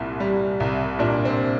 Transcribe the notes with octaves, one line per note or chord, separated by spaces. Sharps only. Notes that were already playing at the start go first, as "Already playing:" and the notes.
Already playing: C2 A#2 E4
G3
C2
A#2 D4
C4